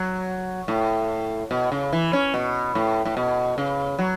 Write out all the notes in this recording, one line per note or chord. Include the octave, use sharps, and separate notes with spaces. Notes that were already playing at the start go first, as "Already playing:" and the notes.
Already playing: F#3
A2
B2
C#3
E3
C#4
B2
A2
A2
B2
C#3
F#3